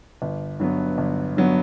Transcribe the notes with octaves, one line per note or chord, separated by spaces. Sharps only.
G1
G2 F#3 B3
G1
G2 F#3 B3